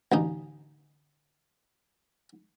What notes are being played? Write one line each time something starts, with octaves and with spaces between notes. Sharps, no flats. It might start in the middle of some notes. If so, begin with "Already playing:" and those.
A1 D2 D#4